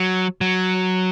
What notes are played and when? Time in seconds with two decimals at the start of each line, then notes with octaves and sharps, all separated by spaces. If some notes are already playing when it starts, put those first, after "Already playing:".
Already playing: F#3
0.41 F#3